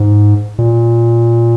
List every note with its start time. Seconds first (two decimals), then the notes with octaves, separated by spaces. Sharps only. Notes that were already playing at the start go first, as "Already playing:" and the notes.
Already playing: G#2
0.59 A#2